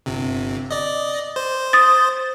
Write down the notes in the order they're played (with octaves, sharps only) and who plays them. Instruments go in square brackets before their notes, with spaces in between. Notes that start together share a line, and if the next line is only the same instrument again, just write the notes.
[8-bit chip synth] G1 C3
D5 D#5
C5
[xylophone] D#6 A6